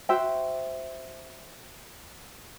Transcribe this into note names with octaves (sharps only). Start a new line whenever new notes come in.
F#4 C5 E5 G5